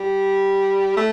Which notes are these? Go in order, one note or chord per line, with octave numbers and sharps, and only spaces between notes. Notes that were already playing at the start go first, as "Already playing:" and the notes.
Already playing: G3
A3